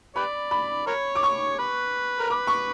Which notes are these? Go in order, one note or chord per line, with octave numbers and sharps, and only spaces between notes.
G4 B4 D5 B5
B5
A#4 C#5
D6
C#6
B4
A#4
B4 D6
C#6